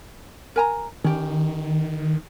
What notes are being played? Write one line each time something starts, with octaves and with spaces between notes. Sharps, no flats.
A#4 G#5 A#5
D#3 C#4 G4